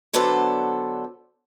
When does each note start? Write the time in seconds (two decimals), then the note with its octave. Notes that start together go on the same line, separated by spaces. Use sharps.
0.13 D3 F#3 B3 D4 A4 C5